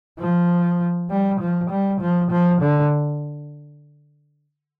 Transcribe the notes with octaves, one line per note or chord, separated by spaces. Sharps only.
F3
G3
F3
G3
F3
F3
D3